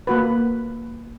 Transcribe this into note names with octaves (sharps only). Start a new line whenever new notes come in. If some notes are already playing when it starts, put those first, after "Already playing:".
A#3 F#4 B4